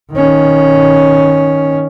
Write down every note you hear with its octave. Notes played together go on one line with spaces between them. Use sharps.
D#3 C#4